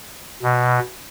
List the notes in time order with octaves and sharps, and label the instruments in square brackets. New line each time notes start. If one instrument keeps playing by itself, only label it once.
[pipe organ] B2